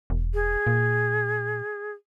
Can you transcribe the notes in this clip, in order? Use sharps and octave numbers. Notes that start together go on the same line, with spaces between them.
E1
G#4
A#2